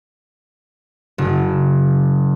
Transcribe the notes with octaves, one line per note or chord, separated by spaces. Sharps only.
F#1